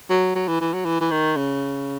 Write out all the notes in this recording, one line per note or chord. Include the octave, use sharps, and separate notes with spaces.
F#3
F#3
E3
E3
F#3
E3
E3
D#3
C#3